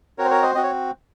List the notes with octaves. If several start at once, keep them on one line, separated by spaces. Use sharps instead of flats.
C4 F#4 A#4 C#5
C5
A#4 C#5
C5 D#5
C4 F#4 D#5
C#5